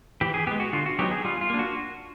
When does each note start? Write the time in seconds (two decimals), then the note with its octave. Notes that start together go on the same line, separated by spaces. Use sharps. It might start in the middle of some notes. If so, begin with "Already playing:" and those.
0.21 E3 G4
0.34 G#4
0.47 G#3 B3 G4
0.60 F#4
0.73 D3 F4
0.86 F#4
0.99 F#3 B3 D#4 G4
1.11 G#4
1.24 G3 F4
1.41 F4
1.50 A#3 D4
1.59 F#4